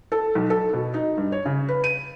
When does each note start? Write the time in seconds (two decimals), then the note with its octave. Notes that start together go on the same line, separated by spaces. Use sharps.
0.12 A4
0.35 B1
0.50 A4
0.73 B2
0.94 D#4
1.17 G2
1.32 C#5
1.45 C#3
1.69 B4
1.84 D#7